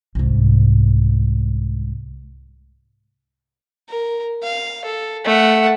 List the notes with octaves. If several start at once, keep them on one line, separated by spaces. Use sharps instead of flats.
C2 G#2
A#4
F5
A4
A3 F#5